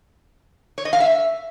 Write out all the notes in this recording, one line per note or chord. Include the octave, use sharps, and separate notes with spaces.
C#5
D#5
F5
E5